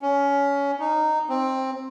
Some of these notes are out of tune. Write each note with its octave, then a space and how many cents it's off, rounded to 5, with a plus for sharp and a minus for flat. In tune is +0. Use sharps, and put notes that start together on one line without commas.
C#4 +20
D#4 -15
C4 +10